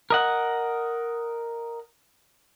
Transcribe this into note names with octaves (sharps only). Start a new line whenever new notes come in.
A#4 D#5 F#5